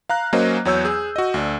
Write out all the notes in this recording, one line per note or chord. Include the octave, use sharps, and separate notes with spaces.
F5 A#5 F#6
F#3 A#3 C#4 C5 D#5
E2 F#3 C#5 E6 G6
G#4
F#4 D#5
D2 D4